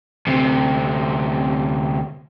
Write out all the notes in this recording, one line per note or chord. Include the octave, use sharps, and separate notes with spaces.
D2 C3